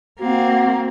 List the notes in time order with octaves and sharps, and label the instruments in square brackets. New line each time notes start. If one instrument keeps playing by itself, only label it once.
[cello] A#3 C4 [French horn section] F#4